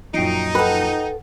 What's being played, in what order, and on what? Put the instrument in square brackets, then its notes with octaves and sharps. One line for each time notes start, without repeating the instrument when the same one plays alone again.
[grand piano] F#2 A#2 F3 [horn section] D#4 [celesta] G5 C7 D7
[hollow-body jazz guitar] A4 B4 [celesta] F#5 G5